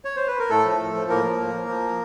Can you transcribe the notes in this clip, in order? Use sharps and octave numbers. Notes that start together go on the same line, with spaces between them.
C#5
C5
B4
A#4
A2 A3 A4
F3
A2
F3
A2 A#3 A#4
F3
A2
F3
F3